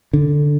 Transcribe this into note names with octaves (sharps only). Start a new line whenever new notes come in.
D3